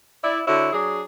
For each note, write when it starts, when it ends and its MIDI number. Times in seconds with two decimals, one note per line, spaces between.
0.23 0.40 64
0.23 0.40 74
0.47 0.71 50
0.47 0.71 64
0.47 0.71 66
0.47 0.71 73
0.72 1.01 54
0.72 1.01 62
0.72 1.01 68